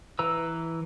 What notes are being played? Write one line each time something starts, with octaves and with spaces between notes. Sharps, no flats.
E3 B4 A#5 E6